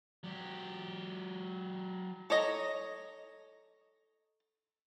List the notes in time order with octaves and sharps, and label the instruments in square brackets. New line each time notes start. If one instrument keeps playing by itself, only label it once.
[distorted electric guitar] F#3 G4
[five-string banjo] A4 C#5 D#5 A#5